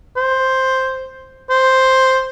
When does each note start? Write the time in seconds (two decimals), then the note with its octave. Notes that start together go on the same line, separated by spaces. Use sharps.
0.17 C5
1.50 C5